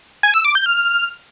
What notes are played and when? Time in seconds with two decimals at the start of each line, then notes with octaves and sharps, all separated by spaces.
0.23 G#5
0.34 E6
0.45 D6
0.55 G6
0.66 F6